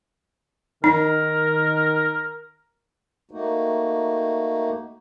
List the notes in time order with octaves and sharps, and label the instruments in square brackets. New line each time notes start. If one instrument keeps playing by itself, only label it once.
[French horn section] D#3 [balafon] D#4 [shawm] A#4
[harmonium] A3 A#3 D#4 F#4